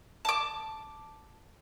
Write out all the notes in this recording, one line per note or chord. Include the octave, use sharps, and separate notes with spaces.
A5 D6